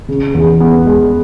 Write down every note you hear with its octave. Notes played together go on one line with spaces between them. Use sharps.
C#3
E2
B3
G#3